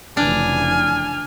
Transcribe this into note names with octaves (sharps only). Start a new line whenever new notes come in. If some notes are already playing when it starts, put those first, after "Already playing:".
F1 C#3 E3 D4 G#5 F6